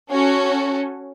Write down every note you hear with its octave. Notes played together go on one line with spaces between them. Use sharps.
C#4 F#4 A4